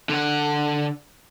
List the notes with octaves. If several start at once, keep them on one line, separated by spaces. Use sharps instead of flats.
D3 F#5